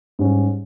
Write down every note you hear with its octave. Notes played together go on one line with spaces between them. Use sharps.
G#2 G3 C#4